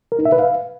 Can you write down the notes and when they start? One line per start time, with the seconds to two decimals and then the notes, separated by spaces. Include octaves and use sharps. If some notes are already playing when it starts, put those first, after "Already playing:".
0.12 A#4
0.19 D#4
0.25 E5
0.32 B4
0.39 F5